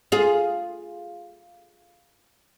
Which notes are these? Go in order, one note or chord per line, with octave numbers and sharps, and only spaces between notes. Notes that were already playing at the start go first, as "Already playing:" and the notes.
F4 G#4